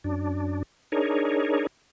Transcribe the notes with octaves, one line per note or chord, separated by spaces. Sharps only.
F#2 D4
D4 D#4 G#4 A#4 C#5